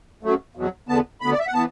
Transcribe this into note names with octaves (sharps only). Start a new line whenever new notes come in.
F#2 F#3 A3
E2 B2 F#3
E2 D3 B3 A5
D2 D3 B3 B5
D5
E5
F#5
E3 B3 A5